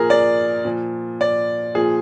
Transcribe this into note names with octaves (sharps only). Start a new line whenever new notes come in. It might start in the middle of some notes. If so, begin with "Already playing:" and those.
Already playing: A#2 F3 G#4 A#4
D5
A#2 F3
D5
A#2 F3 G#4